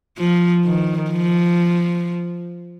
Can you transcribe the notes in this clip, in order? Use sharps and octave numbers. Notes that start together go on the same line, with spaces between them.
F3
D#3
F3